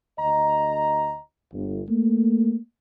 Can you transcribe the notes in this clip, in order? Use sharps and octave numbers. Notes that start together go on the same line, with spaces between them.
D2 D#5 A#5
G1
A3 A#3